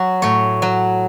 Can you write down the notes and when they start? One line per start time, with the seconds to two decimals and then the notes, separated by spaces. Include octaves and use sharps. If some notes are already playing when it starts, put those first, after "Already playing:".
Already playing: F#3 F#4
0.22 A2 C#5
0.62 F#3